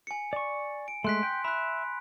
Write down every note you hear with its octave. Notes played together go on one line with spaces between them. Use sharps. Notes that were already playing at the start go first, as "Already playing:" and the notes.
G#5 C#7
D5 C#6
D7
G#3 A3 C6 F#6 B6
G5
E5 B5 F#6